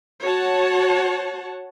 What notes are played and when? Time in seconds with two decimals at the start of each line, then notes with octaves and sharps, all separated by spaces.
0.22 F#4 C#5 F#5 A5